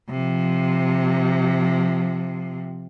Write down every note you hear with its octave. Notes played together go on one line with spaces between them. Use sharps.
C3 F3